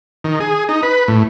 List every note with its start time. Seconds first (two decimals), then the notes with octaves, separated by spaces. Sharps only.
0.24 D#3
0.40 G#4
0.69 D#4
0.83 B4
1.08 A2